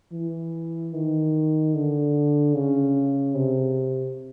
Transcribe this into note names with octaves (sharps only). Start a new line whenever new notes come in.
E3
D#3
D3
C#3
C3